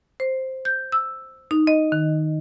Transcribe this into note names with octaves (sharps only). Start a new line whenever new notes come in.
C5
G6
E6
D#4
D#5
D#3